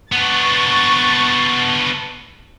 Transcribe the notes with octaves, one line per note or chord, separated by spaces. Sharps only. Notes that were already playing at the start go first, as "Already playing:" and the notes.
B3 D4 C#6 A6